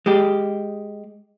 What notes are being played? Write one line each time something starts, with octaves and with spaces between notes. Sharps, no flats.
G#3 G4